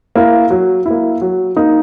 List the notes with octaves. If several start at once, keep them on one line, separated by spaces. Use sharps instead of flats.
A#3 E4
F#3
A#3 E4
F#3
A#3 D#4